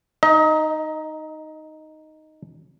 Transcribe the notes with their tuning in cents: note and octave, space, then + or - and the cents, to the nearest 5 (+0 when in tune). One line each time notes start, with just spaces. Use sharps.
D#4 +0 D#5 +30